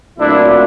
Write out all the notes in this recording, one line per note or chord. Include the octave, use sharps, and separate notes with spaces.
A#2 F#3 A3 C4 D4 E4